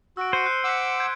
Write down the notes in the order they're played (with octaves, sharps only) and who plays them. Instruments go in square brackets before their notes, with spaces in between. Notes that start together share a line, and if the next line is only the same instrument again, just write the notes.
[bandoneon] F#4 [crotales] E6 D7
[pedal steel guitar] C5 [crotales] C7 C#7 D#7
[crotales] F#6 C7
[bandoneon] F#5 D6 E6 [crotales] B6 C#7 D7
[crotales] G6 G#6 D7